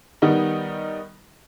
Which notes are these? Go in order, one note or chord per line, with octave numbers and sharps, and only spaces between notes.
D#3 G3 B3 D#4